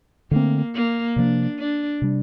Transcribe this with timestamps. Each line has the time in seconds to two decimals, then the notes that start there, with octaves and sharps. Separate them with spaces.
0.31 D3 A3 A#3 C4
0.75 A#3
1.16 C3 F3 A#3 D4
1.58 D4
2.02 C3 G3 D4